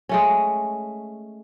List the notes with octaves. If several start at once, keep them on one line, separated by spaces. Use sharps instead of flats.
G#3 A3 C#4